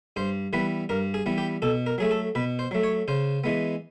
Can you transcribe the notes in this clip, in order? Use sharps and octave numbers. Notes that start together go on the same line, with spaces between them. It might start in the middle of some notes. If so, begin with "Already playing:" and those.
G2 C5
E3 G3 B3 B4
G2 A#4
G#4
E3 G3 B3
G4
B2 A4
A#4
F#3 A3 G#4
A4
B2 B4
C5
F#3 A3
C#5
C#3 C5
E3 G#3 B3